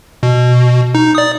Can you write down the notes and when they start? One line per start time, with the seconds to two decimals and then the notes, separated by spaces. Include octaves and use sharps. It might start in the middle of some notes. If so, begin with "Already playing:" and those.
0.23 B2
0.95 D#4
1.15 D5 D#6